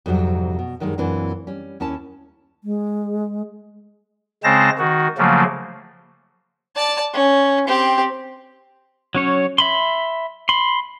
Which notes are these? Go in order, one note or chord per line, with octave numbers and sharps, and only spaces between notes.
F2 G#2 C3 F#3 G3
B2
F#2 D#3 G3 G#3
F#2 A#2 E3 C4 D4
G3 C#4
D#2 C#4 E4 A5
G#3
C#3 G#3 C4 C5 A5 A#6
D#3 F#4
C#3 F3 F#3 A3 A#3
D5 A5
C#4
C4 G4
F#3 C#4 C#5
E5 B5 C6
B5 C6